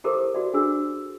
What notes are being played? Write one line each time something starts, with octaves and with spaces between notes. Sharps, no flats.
E4 G4 A4 A#4 C5 D6
F#4 D5
D4 F#4 G#4 E6